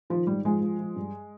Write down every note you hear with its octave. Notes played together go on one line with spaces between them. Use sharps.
D#3 F3
G#2 G3
F3 G#3
F3
F3
G2